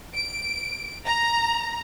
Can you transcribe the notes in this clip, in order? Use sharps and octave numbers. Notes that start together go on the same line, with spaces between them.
D7
A#5